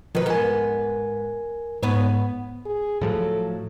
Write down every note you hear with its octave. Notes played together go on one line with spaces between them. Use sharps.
D#3 F3 B4
G#2 B3 A#4 G#5
G#2 B3 B4 C#5
G#4
A2 F3 F#3 A4